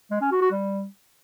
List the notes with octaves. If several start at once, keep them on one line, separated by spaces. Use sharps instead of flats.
G#3
C#4
F#4
F#4
G3